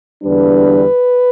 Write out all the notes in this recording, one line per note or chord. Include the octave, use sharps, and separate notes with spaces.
E2 D3 G3 D4 B4